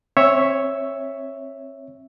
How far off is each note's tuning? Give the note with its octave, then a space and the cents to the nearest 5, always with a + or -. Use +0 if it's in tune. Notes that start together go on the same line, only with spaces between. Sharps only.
C4 +30 C#5 +0 E5 +0